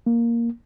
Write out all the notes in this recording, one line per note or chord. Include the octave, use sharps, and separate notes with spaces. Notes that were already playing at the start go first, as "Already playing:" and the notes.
A#3